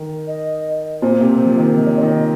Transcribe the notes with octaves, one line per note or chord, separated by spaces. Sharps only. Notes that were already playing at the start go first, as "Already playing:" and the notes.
Already playing: D#3
D#5
A#2 C5
C3
F3
D#3
F3 D#5
C#5
D#3 D#5